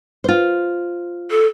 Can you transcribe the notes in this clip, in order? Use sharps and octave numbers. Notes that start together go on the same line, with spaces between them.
F4 C5
A4